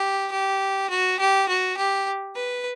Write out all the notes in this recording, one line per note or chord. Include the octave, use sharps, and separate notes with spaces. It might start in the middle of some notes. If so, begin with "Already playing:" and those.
Already playing: G4
G4
F#4
G4
F#4
G4
B4